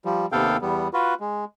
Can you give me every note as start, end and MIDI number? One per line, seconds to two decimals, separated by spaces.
0.05 0.26 53
0.05 0.26 55
0.32 0.57 39
0.32 0.57 48
0.32 0.57 59
0.32 0.57 69
0.32 0.57 77
0.32 0.57 79
0.61 0.88 40
0.61 0.88 55
0.61 0.88 59
0.93 1.14 65
0.93 1.14 66
0.93 1.14 71
1.20 1.45 56